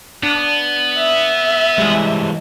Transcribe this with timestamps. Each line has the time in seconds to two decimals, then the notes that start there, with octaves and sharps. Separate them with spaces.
0.23 B3 D4
0.98 E5
1.78 E3 G3 G#3